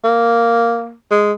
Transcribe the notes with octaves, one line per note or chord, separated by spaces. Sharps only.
A#3
G#3